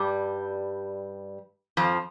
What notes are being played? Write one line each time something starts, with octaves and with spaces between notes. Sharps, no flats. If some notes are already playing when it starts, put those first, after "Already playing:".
Already playing: G2 G3
F2 F3